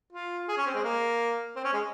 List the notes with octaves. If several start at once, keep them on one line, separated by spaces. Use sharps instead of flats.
F4
G#4
C#4
C4
G#3
A#3
C4
C#4
G#3